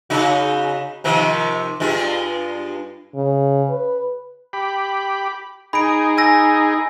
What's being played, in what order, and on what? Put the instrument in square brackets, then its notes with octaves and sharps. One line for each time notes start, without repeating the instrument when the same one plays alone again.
[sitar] C#3 D#4 F#4
C3 D#3 F3
G2 G#3 F4
[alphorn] C#3
B4
[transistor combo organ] G4 B5
[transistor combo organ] D#4 G#4 [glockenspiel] B5 D7
[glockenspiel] G#5 E6 A#6